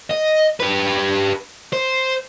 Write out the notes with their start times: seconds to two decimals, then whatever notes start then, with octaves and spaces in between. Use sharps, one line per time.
0.10 D#5
0.60 G4 B4
1.72 C5